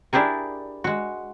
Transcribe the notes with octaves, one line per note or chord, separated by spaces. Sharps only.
D4 E4 G4 G#4 A#4
G#3 F#4